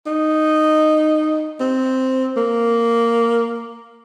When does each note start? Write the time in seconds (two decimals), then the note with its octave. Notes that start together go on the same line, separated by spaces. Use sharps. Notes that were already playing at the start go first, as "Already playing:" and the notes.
0.07 D#4
1.60 C4
2.37 A#3